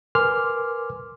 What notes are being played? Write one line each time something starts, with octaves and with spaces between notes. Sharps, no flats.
A#4 B4 G#5 C6 D6 F6